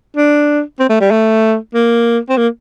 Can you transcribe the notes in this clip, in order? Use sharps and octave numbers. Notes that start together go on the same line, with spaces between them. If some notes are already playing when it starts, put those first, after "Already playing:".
D4
C4
A3
G3
A3
A#3
C4
A#3